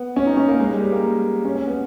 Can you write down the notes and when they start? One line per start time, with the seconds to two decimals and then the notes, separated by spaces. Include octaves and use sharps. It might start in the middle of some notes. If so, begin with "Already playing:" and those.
Already playing: B3
0.16 C#4
0.26 D#4
0.37 C#4
0.48 A#3
0.59 G#3
0.70 G3
0.80 G3
0.92 A#3
1.45 C#4
1.55 C#4
1.67 B3